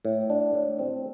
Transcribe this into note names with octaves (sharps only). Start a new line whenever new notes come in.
A2
D4
A2
C4